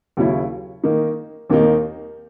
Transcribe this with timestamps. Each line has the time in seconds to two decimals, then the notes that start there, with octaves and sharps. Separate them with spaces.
0.17 D#2 C#3 F#3 C#4 E4
0.84 D#3 A#3 D#4
1.50 D#2 D#3 A#3 D#4